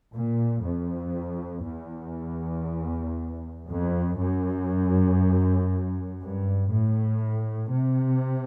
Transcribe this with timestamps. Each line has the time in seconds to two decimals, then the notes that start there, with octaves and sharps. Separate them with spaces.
0.14 A#2
0.63 F2
1.65 E2
3.67 F2
4.18 F#2
6.20 G2
6.70 A2
7.72 C3